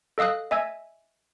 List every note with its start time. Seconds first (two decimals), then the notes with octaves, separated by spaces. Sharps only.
0.18 A4 D#5 F5 D#6 F#6
0.51 D#5 E5 G#5 E6 G#6